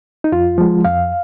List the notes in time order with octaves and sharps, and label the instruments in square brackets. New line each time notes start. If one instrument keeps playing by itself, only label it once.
[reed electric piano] D#4
F2 F4
F3 G#3
F2 F5